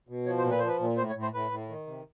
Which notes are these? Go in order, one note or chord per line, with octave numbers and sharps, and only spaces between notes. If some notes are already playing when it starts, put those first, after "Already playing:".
B2
F3 C#5
C5
A#2
B4
F3 C5
B4
A#2
A2 C5
C#5
A2
C5
A2 B4
A2
D#3
C3